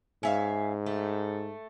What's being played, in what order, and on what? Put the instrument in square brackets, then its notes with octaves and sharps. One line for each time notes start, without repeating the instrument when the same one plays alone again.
[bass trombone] G#2 [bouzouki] C#4 E5 F5
[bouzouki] A3